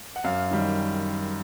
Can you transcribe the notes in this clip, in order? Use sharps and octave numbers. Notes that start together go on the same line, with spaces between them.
F#5
F#2 F5
D#3 G3